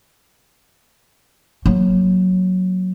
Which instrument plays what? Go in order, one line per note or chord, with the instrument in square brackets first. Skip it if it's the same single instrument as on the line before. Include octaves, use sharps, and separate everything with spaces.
[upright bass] F#3 A#3